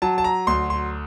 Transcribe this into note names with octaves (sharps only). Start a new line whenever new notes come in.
F#3 A5
A5
A#5
D2 C6
C6